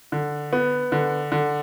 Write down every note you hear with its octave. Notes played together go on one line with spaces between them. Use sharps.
D3
B3
D3
D3